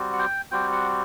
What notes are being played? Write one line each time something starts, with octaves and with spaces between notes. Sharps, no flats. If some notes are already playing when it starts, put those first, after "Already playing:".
Already playing: G3 C4 F#4
F#5
G5
G3 C4 F#4 G5
F#5